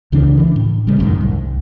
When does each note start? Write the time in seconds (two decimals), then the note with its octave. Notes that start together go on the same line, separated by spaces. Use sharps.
0.12 C#2 C#3 E3 D4
0.37 E3 D4
0.56 A2
0.87 A1 C#3 G3 G#3
0.99 A1 F#2 A2 D#3
1.21 C2